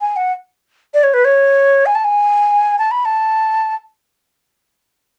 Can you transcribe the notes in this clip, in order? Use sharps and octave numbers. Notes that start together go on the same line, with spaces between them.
G#5
F#5
D5
C#5
B4
C#5
G#5
A5
G#5
A5
B5
A5